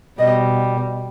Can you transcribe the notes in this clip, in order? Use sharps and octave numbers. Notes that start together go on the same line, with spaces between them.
B2 G3 D#5